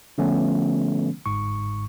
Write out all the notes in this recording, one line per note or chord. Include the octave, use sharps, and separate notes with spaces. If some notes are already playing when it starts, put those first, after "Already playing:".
D3 F3 A3 B3 C#4
G1 G#2 C#6